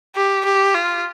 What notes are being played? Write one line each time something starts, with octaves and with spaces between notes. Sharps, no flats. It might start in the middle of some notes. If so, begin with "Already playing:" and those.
G4
G4
F4